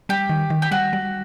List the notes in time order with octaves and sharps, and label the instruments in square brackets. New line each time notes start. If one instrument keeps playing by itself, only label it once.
[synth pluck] G3 [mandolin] G4
[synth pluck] D#3
D#3
[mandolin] G4
[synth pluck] G3 [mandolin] F#4
[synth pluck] G3